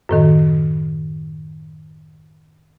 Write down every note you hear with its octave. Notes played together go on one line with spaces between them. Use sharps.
F#2 A2 D#3